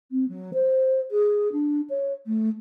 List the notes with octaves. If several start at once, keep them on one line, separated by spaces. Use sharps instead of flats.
C4
F#3
C5
G#4
D4
C#5
A3